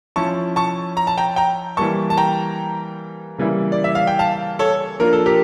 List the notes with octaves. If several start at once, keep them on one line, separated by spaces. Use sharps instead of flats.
F3 C#4 E4 A5 C#6
A5 C#6
A#5
A5
G5 A#5
G5 A#5
E3 G3 A#3 A5 C#6
A5
G5 A#5
C#3 E3 G3 A#3 E4
D5
E5
F5
G5
F5 A5
A4 C#5
F3 A#3 D4 F4 A#4
A4
G4 A#4